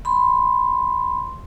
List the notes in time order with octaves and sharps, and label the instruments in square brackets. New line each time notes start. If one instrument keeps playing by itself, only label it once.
[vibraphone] B5 C6